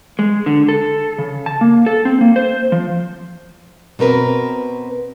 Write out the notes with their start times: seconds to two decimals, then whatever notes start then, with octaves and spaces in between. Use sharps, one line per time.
0.19 G#3
0.46 D3
0.68 A4
1.18 C#3
1.46 A5
1.61 A#3
1.86 A4
2.05 C4
2.21 A#3
2.36 C5
2.72 F3
3.99 B2 C4 A#4 B4